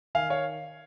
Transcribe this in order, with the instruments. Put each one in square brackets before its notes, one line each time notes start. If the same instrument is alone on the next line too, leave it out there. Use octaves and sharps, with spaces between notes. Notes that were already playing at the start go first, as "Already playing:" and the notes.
[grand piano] D#3 F5 G#5
C#5 F5